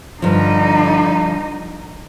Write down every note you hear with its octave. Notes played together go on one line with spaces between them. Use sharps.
G2 D3 F3 D#4